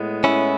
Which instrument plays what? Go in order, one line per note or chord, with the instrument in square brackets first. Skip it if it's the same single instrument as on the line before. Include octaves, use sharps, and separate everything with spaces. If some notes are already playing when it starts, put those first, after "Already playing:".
Already playing: [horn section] A2 G#3 B3
[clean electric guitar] C#4 E4